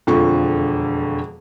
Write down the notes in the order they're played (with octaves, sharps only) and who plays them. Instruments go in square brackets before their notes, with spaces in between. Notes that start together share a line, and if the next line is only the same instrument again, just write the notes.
[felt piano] E1 F2 D3 F3 C#6